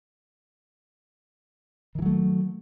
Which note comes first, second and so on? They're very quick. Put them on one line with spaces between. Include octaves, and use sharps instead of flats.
D#3 E3 F#3 A3